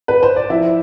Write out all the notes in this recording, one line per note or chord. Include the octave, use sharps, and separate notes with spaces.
B4
C5
D5
F3 E4 E5